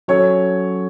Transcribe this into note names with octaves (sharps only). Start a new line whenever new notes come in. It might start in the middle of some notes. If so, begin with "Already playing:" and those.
F#3 C#4 A4 C#5